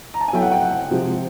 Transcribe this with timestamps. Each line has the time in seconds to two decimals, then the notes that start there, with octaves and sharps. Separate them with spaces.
0.14 A#5
0.21 A5
0.28 G#5
0.33 F#3 B3 E4 A4 G5
0.42 F#5
0.52 G5
0.61 F#5
0.90 C3 F3 G#3